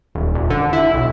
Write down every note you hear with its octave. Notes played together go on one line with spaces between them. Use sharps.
D#1
D#1
D3
E4
B1